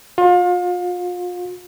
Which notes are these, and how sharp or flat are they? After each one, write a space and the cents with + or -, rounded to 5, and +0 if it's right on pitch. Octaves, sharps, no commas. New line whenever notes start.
F4 +35